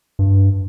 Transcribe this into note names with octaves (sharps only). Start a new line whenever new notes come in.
G2